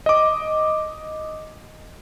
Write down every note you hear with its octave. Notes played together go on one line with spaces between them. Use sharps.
D#5 D6